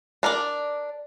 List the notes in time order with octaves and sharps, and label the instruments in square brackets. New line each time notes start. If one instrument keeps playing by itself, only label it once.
[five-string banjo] D4 A#4 D5